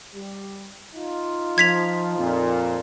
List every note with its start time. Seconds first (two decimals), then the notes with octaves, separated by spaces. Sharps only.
0.14 G3
0.95 D#4 F4
1.58 F3 G#6 B6 F7
2.17 F2 A#2